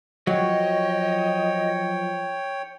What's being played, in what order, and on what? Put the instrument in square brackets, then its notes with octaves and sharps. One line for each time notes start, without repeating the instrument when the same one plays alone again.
[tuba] F3 [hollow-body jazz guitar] F#3 [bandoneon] C#5 G5 [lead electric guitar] D#5